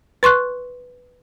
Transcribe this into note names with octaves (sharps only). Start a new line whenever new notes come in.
B4 C6 C#6 F#6